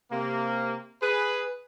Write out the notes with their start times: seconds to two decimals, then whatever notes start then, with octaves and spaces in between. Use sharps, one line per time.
0.12 C3 A#3
1.03 G#4 B4